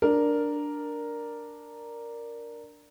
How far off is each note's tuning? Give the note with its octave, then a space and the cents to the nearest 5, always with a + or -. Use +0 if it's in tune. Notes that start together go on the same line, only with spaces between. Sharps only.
D4 +0 A#4 +0